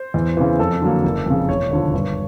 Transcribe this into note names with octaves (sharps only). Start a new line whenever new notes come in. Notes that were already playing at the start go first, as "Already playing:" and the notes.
Already playing: C5
E2
C#3 E3
F2 A4
D3 F#3 A#3
F#1
F2 C#3
E1 C#5
D#2 D3 F3
G2